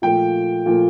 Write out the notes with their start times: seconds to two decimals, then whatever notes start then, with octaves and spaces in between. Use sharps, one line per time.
0.02 A#2 F3 A3 G5
0.66 A#2 F3 A3